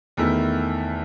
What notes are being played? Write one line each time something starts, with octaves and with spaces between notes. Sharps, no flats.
E2 D#3 A3 E4